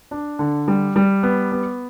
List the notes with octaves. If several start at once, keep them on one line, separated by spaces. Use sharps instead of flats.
D4
D3
G3
G3
B3
B3